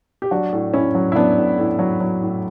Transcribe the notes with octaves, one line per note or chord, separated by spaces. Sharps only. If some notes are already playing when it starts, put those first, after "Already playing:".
G4
F#3 D4 F#4
A2
A2 C#4 E4
F#3
E4
F#3 B3 D4
A2
A2
F#3
F#3
A2